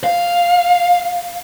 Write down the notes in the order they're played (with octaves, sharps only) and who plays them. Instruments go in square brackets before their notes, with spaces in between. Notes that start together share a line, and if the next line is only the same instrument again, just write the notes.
[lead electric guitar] F5